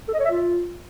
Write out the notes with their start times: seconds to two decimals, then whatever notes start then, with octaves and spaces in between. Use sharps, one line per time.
0.08 A4
0.14 D#5
0.19 C#5
0.25 E5
0.31 F4